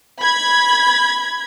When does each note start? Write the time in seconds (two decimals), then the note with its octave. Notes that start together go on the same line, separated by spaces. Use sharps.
0.22 B5 G#6